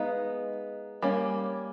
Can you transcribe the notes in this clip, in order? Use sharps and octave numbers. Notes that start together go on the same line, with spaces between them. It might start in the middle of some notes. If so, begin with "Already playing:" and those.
Already playing: G#3 B3 D#4 F5
G3 A#3 C#4